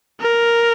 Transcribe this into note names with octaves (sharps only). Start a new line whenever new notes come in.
A#4